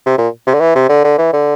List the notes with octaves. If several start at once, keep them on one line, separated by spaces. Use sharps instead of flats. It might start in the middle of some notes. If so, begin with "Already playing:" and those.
C3
A#2
C3
D3
E3
C3
D3
D3
E3
D3